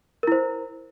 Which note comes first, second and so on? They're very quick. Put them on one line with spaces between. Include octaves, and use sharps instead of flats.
A#4 E4 C5